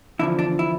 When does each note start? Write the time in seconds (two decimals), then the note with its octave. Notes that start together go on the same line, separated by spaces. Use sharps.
0.19 E2 D3 F3 E4
0.39 D4
0.59 E4